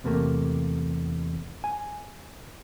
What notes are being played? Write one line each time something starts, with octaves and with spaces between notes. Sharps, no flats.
E2 C3 A3 A#3 G4
G#5